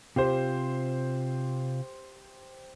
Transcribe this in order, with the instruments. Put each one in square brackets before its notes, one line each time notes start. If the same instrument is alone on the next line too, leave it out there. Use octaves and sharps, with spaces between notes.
[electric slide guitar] C3 F4 [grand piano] G4 C5